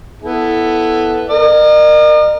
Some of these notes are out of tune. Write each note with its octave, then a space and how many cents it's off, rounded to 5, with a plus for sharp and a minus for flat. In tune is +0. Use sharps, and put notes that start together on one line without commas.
B3 +5 E4 +0 A4 +0
A#4 +0 D#5 -45